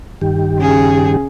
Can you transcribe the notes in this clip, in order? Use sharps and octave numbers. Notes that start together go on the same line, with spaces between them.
G2 D#3 G4
C#3 G#4